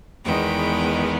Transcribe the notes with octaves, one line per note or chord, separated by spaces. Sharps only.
E2 D#3 G#3 B3 G5